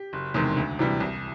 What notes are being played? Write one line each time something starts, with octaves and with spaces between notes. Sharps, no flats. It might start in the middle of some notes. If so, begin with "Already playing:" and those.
Already playing: G4
F#1
E2 C3 D#3 G#3
D2
C3 E3 G3
C2